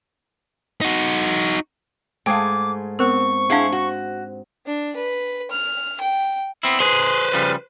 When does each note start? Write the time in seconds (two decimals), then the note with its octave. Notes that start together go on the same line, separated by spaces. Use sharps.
0.81 D#4 F#4
2.26 G#2 G#3 A3 F5 G5 G#5 D6 D#6
2.99 B3 C4 A#4 C#6
3.50 G#3 D4 E4 G#4 F5 F#5
3.72 F#4
4.66 D4
4.96 B4
5.51 F6
6.01 G5
6.63 B3 C4 E4
6.80 G#4 B4 C5
7.33 C#3 F3 G3